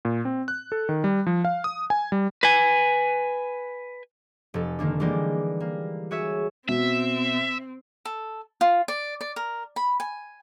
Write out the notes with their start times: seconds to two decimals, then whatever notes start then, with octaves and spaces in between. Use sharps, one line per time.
0.05 A#2
0.25 C4
0.48 F#6
0.72 A4
0.89 D#3
1.04 G3
1.26 F3
1.45 F5
1.64 D#6
1.90 G#5
2.12 G3
2.43 B4 G#5
4.54 F1 A4
4.79 D3 D#3 A#3 D4
5.00 E3 G3 G#3 A#3 G4 D5
5.60 A#3
6.11 F#4 G#4 C#5 E5
6.69 B2 C4 E5
8.05 A4
8.61 F4
8.88 D5
9.21 D5
9.36 A#4
9.76 B5
10.00 G#5